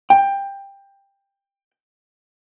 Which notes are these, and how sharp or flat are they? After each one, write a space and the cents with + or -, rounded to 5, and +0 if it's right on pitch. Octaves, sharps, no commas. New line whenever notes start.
G5 +15